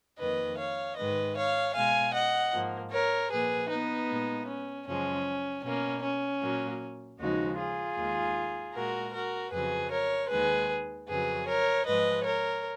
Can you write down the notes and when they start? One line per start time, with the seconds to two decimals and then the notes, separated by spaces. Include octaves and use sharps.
0.19 F2 D#3 A#3 B4 D#5
0.58 C#5 F5
0.97 G#2 D#3 G#3 B4 D#5
1.36 C#5 F5
1.75 B2 G#3 F5 G#5
2.13 D#5 F#5
2.52 G#2 F3 A#3
2.91 A#4 C#5
3.30 A#2 F3 A#3 G#4 B4
3.69 B3 D#4
4.08 A#2 G#3
4.47 C#4
4.86 F#2 C#3 F3 G#3 C#4
5.64 B2 A#3 C#4
6.03 C#4
6.41 A#2 F#3 A#3
7.19 D#2 C#3 F3 G#3 D#4 F#4
7.58 F4 G#4
7.97 D#2 D#3 G#3
8.74 A#2 G#3 F#4 A#4
9.14 F#4 A#4
9.52 F2 C#3 F#3 G#4 B4
9.91 A#4 C#5
10.30 D#2 D#3 G#3 G#4 B4
11.08 F2 C#3 F#3 G#4 B4
11.47 A#4 C#5
11.85 G#2 F3 G#3 B4 D#5
12.24 A#4 C#5